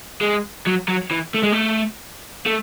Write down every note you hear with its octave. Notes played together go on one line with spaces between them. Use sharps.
G#3
F#3
F#3
E3
A3
G#3
A3
A3